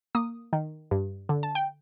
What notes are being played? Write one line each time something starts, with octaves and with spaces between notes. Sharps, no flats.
A#3 D#6
D#3
G2
D3
A5
G5